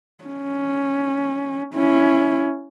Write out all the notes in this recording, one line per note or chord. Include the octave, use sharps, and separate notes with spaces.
C#4
C#4 E4